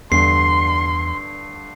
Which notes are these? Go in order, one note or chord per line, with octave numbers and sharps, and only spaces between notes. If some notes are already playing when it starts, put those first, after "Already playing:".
E2 G2 D3 C6 C7